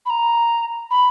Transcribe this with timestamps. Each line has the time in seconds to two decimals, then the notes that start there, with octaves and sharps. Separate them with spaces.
0.06 B5
0.10 A#5
0.91 B5